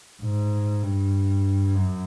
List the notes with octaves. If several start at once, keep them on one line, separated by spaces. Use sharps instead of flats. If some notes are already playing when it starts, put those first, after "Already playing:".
G#2
G2
F#2